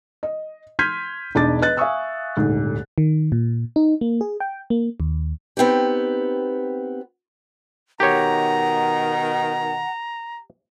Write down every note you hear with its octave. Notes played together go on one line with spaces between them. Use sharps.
D#5
C6 F6 G6 G#6 B6 D#7
E1 D4 D#4 D6 A6
B4 D#5 F#6 A6
E5 F5 G#5 C#6 D#6 E6
D#1 D2 G#2
D#3
A#2
D#4
A#3
G#4
G5
A#3
D#2
B3 C4 D#4 G4
B2 D#3 G4 C#5 F#5 A#5